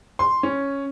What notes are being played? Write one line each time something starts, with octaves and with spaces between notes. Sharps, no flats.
C6
C#4